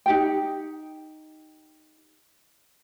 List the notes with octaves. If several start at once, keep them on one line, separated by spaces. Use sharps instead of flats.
D#4 G4 G5